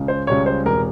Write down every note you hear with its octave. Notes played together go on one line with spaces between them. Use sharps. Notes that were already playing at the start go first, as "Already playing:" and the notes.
Already playing: C#2 C#3
C5
C#2 C#3 G3 C#5
C5
E1 C3 A#4